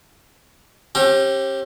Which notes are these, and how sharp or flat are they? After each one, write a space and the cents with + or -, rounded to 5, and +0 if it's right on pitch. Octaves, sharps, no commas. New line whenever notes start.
C#4 -45 G4 +0